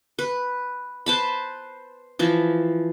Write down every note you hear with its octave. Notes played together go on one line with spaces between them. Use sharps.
B4
B4 C5 A5 B5
E3 F3